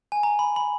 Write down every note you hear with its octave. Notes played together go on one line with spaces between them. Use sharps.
G#5
A#5
B5
B5